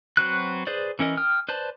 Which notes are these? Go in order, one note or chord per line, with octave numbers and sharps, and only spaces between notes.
F#3 C4 F#4 B4 F#6
G#4 B4 C5 D5
E3 C#4 A#4 D#5
G5 D#6 F6
B4 C5 D5 A5